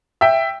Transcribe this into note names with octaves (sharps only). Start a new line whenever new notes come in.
E5 G5